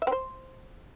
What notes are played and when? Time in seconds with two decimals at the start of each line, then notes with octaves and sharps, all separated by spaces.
0.02 E5
0.07 C4
0.12 C5